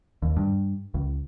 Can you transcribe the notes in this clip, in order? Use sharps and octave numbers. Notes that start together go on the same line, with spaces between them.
D#2
G2
C#2